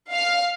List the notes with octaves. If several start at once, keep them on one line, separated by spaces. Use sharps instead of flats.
F5